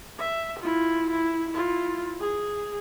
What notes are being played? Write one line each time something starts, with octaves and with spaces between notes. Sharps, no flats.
E5
E4 F4
E4
E4 F4
G#4